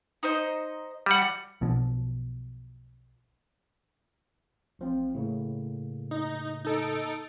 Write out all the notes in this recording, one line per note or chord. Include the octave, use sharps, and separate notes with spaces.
D#4 C5 D#5
G3 F#5
B1 B2 F3
A1 F3 C4
A2 C#3 A#3
D#4
D#4 A4 D7